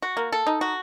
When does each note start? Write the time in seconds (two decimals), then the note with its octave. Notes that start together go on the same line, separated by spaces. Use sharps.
0.02 F#4
0.17 A#3
0.32 A4
0.47 D#4
0.61 F#4